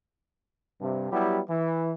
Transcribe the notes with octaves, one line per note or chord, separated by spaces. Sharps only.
G2 C3
F#3 G3 B3 E4 G4
E3